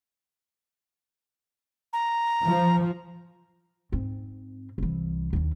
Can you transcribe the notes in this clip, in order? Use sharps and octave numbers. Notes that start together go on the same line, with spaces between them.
A#5
F3
G#2 C4
C2 E3
D#2 D3